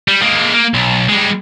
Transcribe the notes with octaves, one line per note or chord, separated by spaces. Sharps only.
G3
G#3 A#3
A#3
B1
G3 G#3